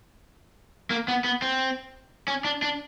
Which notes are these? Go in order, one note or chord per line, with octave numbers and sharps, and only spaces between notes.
A#3
B3
B3
C4
C#4
D4
D4